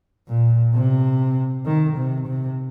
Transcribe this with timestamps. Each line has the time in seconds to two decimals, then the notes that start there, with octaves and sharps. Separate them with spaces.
0.28 A#2
0.74 C3
1.66 D#3
1.97 C3
2.27 C3